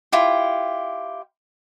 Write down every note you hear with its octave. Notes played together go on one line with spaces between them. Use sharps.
E4 F4 G4